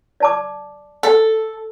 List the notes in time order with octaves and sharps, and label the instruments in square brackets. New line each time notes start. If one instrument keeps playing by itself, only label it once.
[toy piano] D5 A5 D6
[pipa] A4